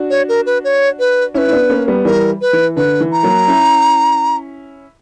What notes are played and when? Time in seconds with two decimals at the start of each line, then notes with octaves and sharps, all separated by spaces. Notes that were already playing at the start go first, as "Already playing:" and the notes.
Already playing: D4 F#4
0.10 C#5
0.29 A#4
0.46 B4
0.64 C#5
0.99 B4
1.34 C#4 E4 C#5
1.38 B4
1.48 E4
1.52 B3 D4
1.69 A#3 C#4
1.88 G3 B3
2.05 E3 G3 A#4
2.41 B4
2.53 E3
2.76 D3 B4
3.00 E3
3.12 A#5
3.23 F#3 A#3
3.47 C#4 E4